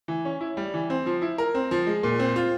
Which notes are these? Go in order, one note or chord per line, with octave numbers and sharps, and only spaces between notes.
E3
C#4
E4
G3
E3
C4
F3
E4
A#4
C4
F3
G#3
A#2
C4
F4